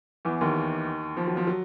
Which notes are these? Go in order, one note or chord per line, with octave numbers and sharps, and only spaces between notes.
E2 E3
D#2 D#3
F3
F#3
F3
F#3